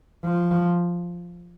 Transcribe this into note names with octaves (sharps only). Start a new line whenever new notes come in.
F3